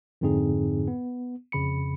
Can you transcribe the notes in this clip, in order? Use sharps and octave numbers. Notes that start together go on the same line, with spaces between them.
F2 G#2 D3 C4 D#4 G#4
B3
F2 C#3 B5 C#7